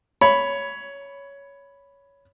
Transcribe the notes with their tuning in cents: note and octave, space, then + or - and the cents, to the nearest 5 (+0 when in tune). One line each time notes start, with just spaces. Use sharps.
C#5 +10 B5 +0